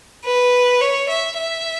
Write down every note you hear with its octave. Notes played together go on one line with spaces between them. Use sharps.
B4
C#5
E5
E5